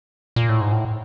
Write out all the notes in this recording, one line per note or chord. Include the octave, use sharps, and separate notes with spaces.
A#2
A2
G#2
A2